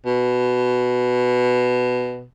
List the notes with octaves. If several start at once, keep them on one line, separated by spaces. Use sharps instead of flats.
B2